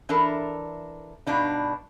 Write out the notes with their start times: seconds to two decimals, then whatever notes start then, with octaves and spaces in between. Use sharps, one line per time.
0.09 E3 D4 A4 A#4
1.27 G2 B2 D4 D#4